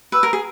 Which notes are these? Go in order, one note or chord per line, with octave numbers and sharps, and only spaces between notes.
B4 E6
A#4
G#4